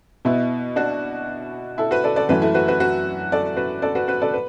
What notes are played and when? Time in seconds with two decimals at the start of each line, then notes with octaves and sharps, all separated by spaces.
0.25 B2 B3 E4
0.76 D4 F#4
1.78 E4 A4
1.91 F#4 B4
2.04 A4 D5
2.16 A4 D5
2.29 F#2 E3 A3 F#4 B4
2.42 E4 A4
2.54 F#4 B4
2.68 F#4 B4
2.80 F#4 B4
3.32 A4 D5
3.57 F#4 B4
3.82 A4 D5
3.95 F#4 B4
4.08 F#4 B4
4.22 A4 D5
4.34 B4